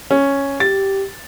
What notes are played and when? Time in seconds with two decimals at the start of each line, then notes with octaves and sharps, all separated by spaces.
0.11 C#4
0.60 G4 A6